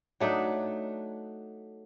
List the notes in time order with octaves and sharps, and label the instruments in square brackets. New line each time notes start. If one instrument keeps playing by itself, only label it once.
[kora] F#3 A3 D4 D#4